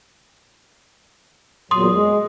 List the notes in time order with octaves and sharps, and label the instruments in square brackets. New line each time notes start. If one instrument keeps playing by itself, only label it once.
[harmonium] E2 A#2 F#3 [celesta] C6 D#6
[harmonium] G#3